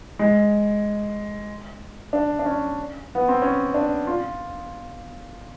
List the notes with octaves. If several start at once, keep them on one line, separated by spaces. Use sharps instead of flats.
G#3
D4
D4
C#4
B3
C4
C#4
D4
F4